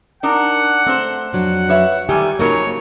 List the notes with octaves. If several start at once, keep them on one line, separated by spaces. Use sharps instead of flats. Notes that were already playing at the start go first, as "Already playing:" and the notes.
D4 D#4 A#4 F#5
A3 C4 C5
F2 F#3 D4 F#5
B4 C#5 E5
D#3 G3 A3 G4 G#5
C#3 F3 F#3 A#3 D#4 A#4 C#5